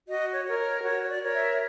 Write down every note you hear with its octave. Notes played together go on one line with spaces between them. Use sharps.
F#4 D#5
C#5
A#4 C#5
C#5
F#4 C#5
C#5
D5
A#4 C#5
E5